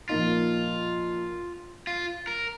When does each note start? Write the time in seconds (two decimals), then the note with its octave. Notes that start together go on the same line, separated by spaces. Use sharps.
0.09 A#2 F3 A#3 D#4 F4
1.87 F4
2.27 A#4